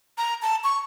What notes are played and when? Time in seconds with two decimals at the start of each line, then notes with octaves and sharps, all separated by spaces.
0.18 A#5
0.42 A5
0.64 C#6